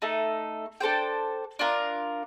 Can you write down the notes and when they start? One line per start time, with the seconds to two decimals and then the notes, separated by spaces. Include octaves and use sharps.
0.02 A3 D#4 A4
0.80 D4 A4 C5 G5
1.59 D4 F4 A#4